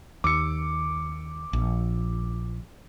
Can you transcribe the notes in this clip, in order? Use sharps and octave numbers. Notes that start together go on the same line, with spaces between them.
D#2 D6 E6 C#7
A#1